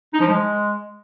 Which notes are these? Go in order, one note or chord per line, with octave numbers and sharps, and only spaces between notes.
D#4
F3
G#3